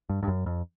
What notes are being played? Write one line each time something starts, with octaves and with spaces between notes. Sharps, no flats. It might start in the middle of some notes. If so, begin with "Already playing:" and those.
G2
G2
F#2
F2